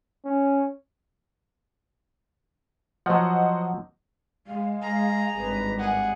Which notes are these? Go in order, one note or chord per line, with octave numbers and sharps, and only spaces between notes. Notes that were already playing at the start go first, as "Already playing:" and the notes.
C#4
F3 F#3 C5 D#5 F#5
G#3 F5
G#4 A#5
G#1 G2 B4
G#4 F#5